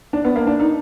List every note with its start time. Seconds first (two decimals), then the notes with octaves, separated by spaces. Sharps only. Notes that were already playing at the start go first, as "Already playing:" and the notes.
0.13 D4
0.25 B3
0.36 A#3
0.47 D4
0.60 D#4